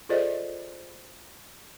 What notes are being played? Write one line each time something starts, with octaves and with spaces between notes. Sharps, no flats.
F4 G#4 A4 C5 D5 D#5